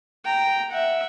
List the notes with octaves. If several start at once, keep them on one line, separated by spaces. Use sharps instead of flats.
G5 A#5
E5 F#5